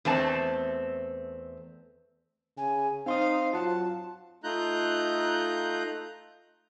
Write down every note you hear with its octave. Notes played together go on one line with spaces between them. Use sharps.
E2 A3 C4 A5
C#3 G#5
C4 D#4 C5 F5 C6 D#6
F#3 F4 F#5 A5
A3 D#4 F4 A#5 F#6 G6